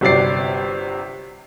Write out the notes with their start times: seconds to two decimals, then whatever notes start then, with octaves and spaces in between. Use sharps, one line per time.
0.01 G1 C3 F#3 D5 C7